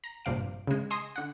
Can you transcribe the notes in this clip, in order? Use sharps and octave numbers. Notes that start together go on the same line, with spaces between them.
A#5
A#1 G2 C3 F5 D7
C#3 G#3
D#5 G#5 C6 D#6
D3 F#5